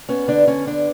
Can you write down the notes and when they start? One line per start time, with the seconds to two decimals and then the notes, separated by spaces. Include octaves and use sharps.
0.09 B3 C#4
0.28 D3 D4
0.47 D3 C#4
0.67 B3 D4